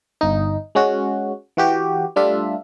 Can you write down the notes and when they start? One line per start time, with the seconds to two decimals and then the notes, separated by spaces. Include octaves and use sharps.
0.21 G1 D#4
0.75 G#3 C#4 F#4
1.57 E3 F#4 G4
2.16 G3 A3 D4 F4 E5